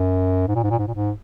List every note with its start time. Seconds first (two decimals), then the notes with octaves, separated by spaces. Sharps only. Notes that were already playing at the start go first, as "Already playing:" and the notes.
Already playing: F#2
0.48 G#2
0.55 A#2
0.64 G#2
0.71 A#2
0.79 G#2
0.87 A#2
0.94 G#2